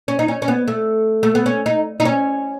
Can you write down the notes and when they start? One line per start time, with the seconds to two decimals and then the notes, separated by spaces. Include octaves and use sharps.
0.08 C#4
0.19 D#4
0.28 C#4
0.42 C#4
0.48 B3
0.68 A3
1.23 A3
1.35 B3
1.46 C#4
1.66 D#4
2.00 D#4
2.05 C#4